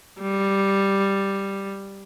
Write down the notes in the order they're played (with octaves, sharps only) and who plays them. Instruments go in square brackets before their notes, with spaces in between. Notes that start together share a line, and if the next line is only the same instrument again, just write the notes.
[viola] G3